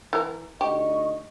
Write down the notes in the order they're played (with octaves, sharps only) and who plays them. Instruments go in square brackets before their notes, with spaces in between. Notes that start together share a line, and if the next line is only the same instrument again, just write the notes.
[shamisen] E3 A#4
[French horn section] D2 D#4 D#5 [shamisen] G4 [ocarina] C#6